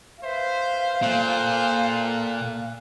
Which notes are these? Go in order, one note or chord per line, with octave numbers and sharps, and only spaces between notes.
B4 C5 E5 F5
A#2 A4 C5 G5 F#6